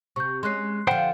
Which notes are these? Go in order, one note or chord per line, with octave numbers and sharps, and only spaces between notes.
C3 C#6 G6
G#3 C#4 C6 F#6 C7
D3 F3 C5 F#5 G5